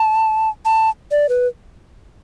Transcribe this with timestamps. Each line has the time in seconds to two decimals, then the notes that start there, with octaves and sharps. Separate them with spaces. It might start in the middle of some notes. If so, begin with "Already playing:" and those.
Already playing: A5
0.65 A5
1.11 D5
1.29 B4